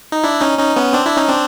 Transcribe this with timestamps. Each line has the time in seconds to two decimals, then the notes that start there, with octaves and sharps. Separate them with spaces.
0.12 D#4
0.23 D4 E4
0.41 C#4 D#4
0.58 C#4 D#4
0.76 B3 C#4
0.93 C4 D4
1.06 D4 E4
1.16 C#4 D#4
1.28 C4 D4